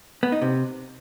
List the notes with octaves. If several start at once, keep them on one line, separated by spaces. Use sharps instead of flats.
B3
D#4
C3